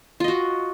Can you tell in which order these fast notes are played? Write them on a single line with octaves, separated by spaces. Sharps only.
F4 D#5 F#4